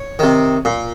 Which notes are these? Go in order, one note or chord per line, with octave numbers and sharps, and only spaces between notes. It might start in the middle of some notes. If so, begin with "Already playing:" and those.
Already playing: C#5
C3 D#3
A#2